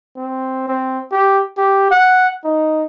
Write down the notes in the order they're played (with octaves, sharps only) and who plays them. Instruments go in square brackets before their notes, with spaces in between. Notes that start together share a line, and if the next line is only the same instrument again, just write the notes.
[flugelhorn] C4
C4
G4
G4
F#5
D#4